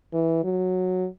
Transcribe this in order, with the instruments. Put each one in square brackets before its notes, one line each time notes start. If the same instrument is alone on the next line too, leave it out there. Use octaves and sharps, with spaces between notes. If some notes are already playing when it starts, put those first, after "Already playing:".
[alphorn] E3
F#3